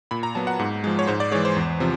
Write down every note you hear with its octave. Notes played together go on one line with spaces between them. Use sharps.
A#2 B5
A#5
F#3 B3 A5
F#5
G#2
F3 G#3
C#5
G#2 C5
D5
E3 G#3 C#5
C5
E2
C3 F3